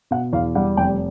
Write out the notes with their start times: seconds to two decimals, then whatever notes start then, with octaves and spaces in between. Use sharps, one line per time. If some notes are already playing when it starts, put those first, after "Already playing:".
0.11 B2 F#5
0.33 E2 F5
0.55 G3 F#5
0.77 F1 G5